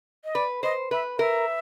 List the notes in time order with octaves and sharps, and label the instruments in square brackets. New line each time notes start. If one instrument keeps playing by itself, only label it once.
[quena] D#5
[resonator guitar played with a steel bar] B4 [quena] D5
[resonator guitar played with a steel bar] C5 [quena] D#5
[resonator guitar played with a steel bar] B4 [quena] E5
[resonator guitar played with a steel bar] A#4 [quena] E5